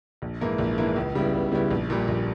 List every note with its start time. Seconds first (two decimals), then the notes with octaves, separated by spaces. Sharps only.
0.22 A#1
0.41 G#2 E3 A#3 E4
0.58 A#1
0.78 G#2 E3 A#3 E4
0.96 C#2
1.15 C#3 G3 B3 E4
1.33 C#2
1.52 C#3 G3 B3 E4
1.71 A#1
1.90 A#2 G3
2.08 A#1